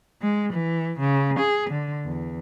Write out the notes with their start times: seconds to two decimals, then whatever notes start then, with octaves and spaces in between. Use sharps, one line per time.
0.22 G#3
0.53 E3
1.00 C#3
1.39 G#4
1.70 D3
2.06 E2